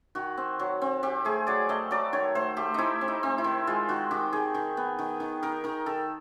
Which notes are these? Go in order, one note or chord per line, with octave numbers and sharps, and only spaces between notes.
D#3 F#4
C4
F#3
C4
C4 G4
A3 G#4
F#3 D5
A3 D#5
F#3 D5
D#3 C#5
A3 C5
A3 G4
C4 D#4 E4
C4
D#4
C4
E4
D#3
G#3 F4
D#3 F#4
D#3 G4
D#3 G#4
D#3
B3
D#3
D#3
D#3 A#4
D#3 A#4
D#3 A4